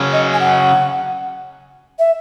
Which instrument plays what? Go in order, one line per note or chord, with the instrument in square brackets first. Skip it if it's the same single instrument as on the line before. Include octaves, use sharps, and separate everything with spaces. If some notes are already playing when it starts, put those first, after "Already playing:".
Already playing: [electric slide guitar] C#3 F#3 C#4
[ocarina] D#5
G#5
F#5
E5